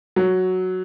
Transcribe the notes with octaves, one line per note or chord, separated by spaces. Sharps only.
F#3